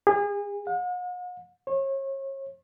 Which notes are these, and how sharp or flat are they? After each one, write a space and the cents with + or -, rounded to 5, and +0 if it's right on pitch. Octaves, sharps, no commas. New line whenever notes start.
G#4 -35
F#5 -45
C#5 -35